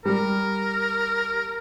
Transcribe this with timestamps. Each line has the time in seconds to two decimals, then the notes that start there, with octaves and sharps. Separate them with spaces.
0.05 G3 A#4